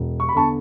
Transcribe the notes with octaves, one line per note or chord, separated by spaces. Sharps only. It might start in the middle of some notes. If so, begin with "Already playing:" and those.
Already playing: E1
C#6
B5
E2 D3 A5 C#6